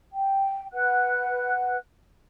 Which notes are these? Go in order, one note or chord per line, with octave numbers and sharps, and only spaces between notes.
G5
B4 F#5 F#6